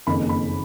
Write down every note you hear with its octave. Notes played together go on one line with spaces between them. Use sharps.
F#1 F2 D#3 A#3 C#4 B5
B5